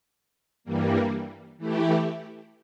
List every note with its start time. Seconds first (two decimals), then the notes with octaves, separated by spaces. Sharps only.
0.64 G2 E3 G3 A#3
1.58 E3 A3 E4 G4